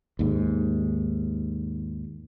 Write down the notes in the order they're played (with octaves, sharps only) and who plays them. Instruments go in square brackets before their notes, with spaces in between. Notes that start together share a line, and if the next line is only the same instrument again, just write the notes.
[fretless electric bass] D#2 G#2